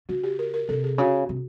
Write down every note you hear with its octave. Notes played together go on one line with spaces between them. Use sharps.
C#3 F#4
G4
A#4
A#4
C3 A4
G#4
C#3 F#4
C3